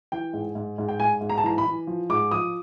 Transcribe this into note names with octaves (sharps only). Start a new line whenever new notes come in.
E3 G5
G#2
G#2
G#2
G5
G#2 G#5
G#2
A#5
A5
E3 A#5
B5
E3
F3
G#2 D6
F3 D#6